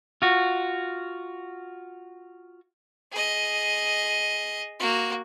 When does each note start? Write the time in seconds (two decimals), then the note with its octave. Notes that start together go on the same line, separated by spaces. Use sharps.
0.22 F4 F#4
3.11 G#4 D#5
4.79 A#3 F#4